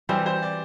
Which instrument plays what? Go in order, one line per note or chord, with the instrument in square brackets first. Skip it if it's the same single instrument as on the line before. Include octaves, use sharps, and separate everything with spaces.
[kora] E3 G3 C4 [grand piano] C5
[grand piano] C5
D5